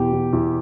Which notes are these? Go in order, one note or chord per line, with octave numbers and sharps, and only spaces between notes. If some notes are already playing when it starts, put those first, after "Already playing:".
Already playing: E2 B2 G4
E2
E2